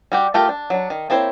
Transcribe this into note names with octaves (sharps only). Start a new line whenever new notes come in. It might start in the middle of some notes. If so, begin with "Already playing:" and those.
G3 F#4 G4
A3 F4 G4 A#4
D4
F#3 D4
D#3
A#3 C4 E4 C5 C#5